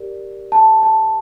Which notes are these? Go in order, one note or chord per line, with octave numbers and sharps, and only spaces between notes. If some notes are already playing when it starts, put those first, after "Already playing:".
Already playing: G4 A#4 D5
A5
A5